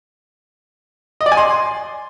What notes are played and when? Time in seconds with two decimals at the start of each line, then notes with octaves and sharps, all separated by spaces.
1.21 D#5
1.26 D5
1.32 G#5
1.37 C6